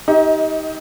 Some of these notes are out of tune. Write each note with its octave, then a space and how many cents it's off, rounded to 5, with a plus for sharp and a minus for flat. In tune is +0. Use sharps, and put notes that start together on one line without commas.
D#4 +20 G4 +0 D#5 +40